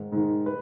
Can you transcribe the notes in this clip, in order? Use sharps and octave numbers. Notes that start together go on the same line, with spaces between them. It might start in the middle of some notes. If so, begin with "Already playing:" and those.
Already playing: G#2 D#3
G#2 D#3
B4